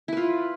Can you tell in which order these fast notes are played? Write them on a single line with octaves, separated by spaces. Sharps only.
E4 B4 F4